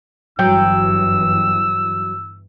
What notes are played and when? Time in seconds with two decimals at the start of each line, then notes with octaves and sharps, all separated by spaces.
0.39 G1 G2 E3 F#3 G5 E6